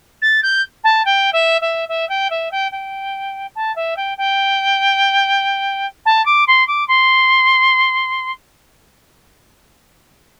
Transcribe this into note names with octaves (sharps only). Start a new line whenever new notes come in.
A6
G6
A5
G5
E5
E5
E5
G5
E5
G5
G5
A5
E5
G5
G5
A5
D6
C6
D6
C6